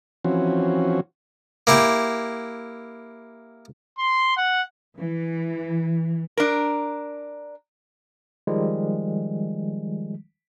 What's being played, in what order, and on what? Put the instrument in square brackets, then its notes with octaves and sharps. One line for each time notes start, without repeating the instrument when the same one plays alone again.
[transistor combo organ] E3 F3 C4 C#4 F#4
[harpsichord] A#3 E4 G4 G5
[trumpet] C6
F#5
[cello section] E3
[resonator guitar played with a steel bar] D4 A#4
[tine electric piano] D#3 F3 G3 G#3